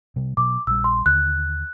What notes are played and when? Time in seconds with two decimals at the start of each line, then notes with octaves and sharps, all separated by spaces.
0.16 C3 G3
0.37 B2 F#3 D6
0.67 A#1 G3 E6
0.84 C6
1.06 D#2 D3 F#6